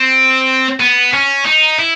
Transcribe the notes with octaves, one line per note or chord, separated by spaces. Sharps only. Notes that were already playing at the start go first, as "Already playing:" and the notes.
Already playing: C4
B3
C#4
D#4
E4